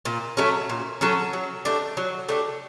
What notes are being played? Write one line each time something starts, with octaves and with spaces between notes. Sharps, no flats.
A#2
F#3 A3 C#4
A#2
F#3 A3 C#4
F#3
A3 D4 G4
F#3
A3 D4 G4